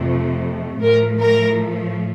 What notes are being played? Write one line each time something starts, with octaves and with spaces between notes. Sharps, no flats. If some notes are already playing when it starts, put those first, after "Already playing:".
Already playing: F2 C3 F3 A3
A2 F3 A3 A#4
A#4